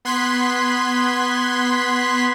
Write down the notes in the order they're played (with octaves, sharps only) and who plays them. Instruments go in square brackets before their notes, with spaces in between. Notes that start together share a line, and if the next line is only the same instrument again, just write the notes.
[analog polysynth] B3 C6 F#6 G#6 B6